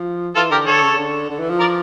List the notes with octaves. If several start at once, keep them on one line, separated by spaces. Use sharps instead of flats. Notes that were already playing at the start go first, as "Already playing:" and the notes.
Already playing: F3
E3 F4 A4
D3 G4 A#4
D3 A4 C#5
C#3
D3
D3
E3
F3
A#4 D5